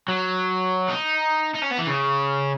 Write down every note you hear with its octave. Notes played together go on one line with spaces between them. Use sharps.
F#3
D#4
D#4
C#4
B3
E3
C#3